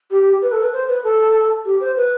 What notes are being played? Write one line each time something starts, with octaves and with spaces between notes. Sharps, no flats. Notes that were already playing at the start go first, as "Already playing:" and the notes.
G4
B4
A4
B4
C5
B4
A4
G4
C5
B4